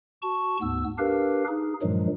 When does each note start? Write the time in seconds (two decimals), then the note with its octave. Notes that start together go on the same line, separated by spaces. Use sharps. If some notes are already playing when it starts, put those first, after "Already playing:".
0.22 F#4 A5 C#6
0.62 D2 G#2 B3 E6
0.98 D4 G4 A#4 B4 F5
1.48 D#4 G#4
1.82 G2 A#2 D#3 F3 F#3 G#3